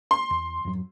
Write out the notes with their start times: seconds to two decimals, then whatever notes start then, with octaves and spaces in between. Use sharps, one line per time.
0.11 C6
0.31 E2
0.65 F2 G#2 F#3